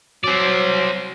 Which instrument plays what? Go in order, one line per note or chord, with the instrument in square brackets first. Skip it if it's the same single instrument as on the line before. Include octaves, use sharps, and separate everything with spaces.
[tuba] F#3 [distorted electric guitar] C4 D5